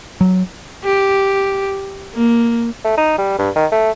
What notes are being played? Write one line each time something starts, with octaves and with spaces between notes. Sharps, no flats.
F#3
G4
A#3
A3
D#4
G3
G2
D#3
A3